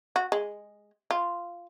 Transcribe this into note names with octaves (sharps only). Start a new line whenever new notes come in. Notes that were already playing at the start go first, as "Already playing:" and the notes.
F#4
G#3
F4